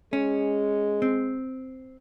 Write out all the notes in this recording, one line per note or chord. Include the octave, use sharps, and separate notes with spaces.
G#3 C#4
C4